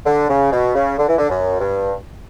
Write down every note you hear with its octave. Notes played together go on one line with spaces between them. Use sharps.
D3
C#3
B2
C#3
D3
E3
D3
F#2
G2